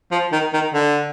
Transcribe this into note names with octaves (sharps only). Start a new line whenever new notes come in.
F3
D#3
D#3
D3